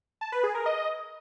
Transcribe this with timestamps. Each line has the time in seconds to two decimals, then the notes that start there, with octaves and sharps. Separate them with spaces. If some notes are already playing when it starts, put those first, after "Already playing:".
0.21 A5
0.32 B4
0.43 G#4
0.55 A#4
0.66 D#5